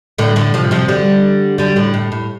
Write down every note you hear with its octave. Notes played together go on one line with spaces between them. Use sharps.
A2 D3
A2 D3
C3 F3
C3 F3
D3 G3
D3 G3
A2 D3
A2
A2